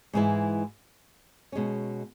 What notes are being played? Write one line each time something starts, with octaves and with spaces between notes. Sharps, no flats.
G#2 E3 G#3 E4
B2 G#3 C#4